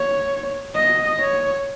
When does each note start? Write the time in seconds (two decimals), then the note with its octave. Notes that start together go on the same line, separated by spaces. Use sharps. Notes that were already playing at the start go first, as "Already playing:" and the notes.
Already playing: C#5
0.75 D#5
1.20 C#5